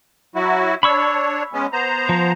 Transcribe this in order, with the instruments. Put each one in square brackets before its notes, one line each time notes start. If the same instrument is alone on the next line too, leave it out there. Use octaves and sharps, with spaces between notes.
[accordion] F#3 E4 F#4
[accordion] D4 C#5 [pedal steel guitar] B5 C#6 E6
[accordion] G#3 B3 C#4
B3 C5 A#5
[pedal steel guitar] F3